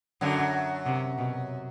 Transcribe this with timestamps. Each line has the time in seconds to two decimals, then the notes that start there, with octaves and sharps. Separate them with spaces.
0.21 F#2 D3 F#3
0.86 C3
1.18 B2